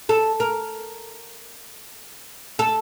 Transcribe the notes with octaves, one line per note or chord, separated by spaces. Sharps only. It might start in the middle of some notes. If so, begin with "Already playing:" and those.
A4
A#4
A4